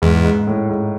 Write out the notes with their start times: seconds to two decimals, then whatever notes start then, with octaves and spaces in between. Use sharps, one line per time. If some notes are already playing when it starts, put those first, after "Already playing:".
0.02 E2 G#2
0.24 G#2
0.47 A2
0.69 G#2